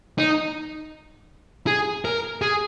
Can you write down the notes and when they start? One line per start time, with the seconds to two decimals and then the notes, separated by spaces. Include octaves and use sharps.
0.18 D#4
1.67 G#4
2.05 A#4
2.42 G#4